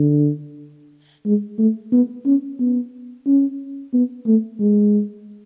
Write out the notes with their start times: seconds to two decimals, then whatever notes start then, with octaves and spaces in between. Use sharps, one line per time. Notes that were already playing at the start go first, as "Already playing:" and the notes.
Already playing: D3
1.25 G#3
1.58 A3
1.92 B3
2.26 C#4
2.59 B3
3.26 C#4
3.93 B3
4.26 A3
4.60 G#3